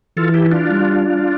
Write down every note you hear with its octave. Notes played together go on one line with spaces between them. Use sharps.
E3 F4 A4
E4 G4
D4 F4
G3